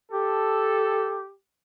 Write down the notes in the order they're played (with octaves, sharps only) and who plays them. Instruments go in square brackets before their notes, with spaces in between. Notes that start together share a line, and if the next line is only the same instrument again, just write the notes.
[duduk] G4 [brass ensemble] A4